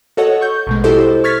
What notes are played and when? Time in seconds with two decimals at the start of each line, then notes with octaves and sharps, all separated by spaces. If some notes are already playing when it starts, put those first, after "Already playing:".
0.17 F#4 A4 C#5 D#5 F#5
0.41 C#6 G6
0.67 A#1 B2 G#3
0.84 E4 F#4 G4 A4 C5 D#5
1.24 C#6 F6 G#6 A6 B6